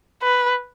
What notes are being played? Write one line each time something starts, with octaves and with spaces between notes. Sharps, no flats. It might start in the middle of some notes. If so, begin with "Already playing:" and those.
B4